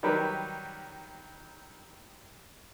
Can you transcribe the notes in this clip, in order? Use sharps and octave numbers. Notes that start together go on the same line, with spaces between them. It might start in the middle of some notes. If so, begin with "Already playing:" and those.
D#3 F#3 G3 G4 A#4 B4